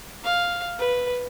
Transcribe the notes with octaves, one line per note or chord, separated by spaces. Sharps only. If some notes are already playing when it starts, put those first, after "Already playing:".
F5
B4